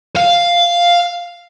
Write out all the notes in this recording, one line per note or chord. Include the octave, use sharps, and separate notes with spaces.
F5